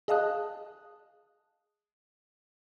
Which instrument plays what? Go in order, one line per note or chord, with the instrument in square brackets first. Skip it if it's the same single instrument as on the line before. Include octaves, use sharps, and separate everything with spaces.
[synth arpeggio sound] G#4 D#5 F5 A5 D#6 F#6